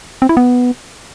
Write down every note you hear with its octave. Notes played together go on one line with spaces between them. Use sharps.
C4
E4
B3